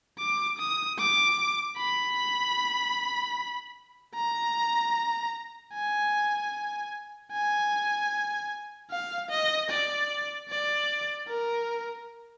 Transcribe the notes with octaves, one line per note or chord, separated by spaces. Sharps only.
D6
D#6
D6
B5
A#5
G#5
G#5
F5
D#5
D5
D5
A#4